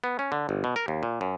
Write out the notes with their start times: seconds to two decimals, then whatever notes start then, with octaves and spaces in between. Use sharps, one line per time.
0.04 B3
0.19 C#4
0.32 D3
0.49 G1
0.64 B2
0.76 A#4
0.88 D#2
1.03 A#2
1.21 F#2